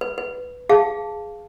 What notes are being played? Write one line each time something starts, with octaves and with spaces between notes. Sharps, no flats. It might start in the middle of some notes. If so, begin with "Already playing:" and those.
B4
B4
G#4 F5 A5